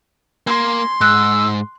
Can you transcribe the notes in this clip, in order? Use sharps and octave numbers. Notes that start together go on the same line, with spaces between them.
A#3 G#5 C6
G#2 E6 F#6